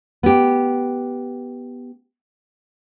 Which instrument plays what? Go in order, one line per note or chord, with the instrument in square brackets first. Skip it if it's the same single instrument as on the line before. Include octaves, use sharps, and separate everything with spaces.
[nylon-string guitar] B3 G4